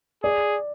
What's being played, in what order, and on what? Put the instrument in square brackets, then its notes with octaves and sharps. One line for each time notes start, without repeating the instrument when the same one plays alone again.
[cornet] G#4 [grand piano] D5